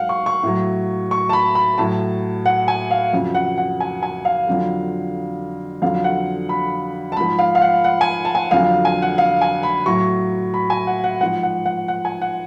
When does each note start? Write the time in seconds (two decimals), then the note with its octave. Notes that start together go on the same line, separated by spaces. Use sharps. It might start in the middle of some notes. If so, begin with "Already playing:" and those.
Already playing: G#2 F#3 F5 F#5
0.09 C#6
0.26 C#6
0.43 A2 F#3
1.11 C#6
1.29 A5
1.33 B5
1.55 B5
1.78 A2 F#3 A5
2.46 F#5
2.68 G#5
2.91 F5
3.13 F2 C#3 F#3
3.35 F#5
3.58 F#5
3.80 G#5
4.03 G#5
4.25 F5
4.47 F2 D3 F#3
5.82 F2 D3 F#3 F5
6.04 F#5
6.49 B5
7.12 A5
7.17 G#2 F3 B5
7.39 F5
7.55 F5
7.62 F#5
7.84 F#5
8.01 G#5
8.25 A5
8.35 G#5
8.51 F2 D3 F#3 F5
8.85 G#5
9.02 F#5
9.18 F5
9.41 G#5
9.63 B5
9.86 A2 F#3 C#6
10.54 B5
10.70 G#5
10.87 F#5
11.04 F#5
11.21 G#2 F3 F#5
11.43 F#5
11.66 F#5
11.88 F#5
12.05 G#5
12.21 F#5